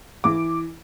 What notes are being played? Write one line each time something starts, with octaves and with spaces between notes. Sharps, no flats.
E3 D6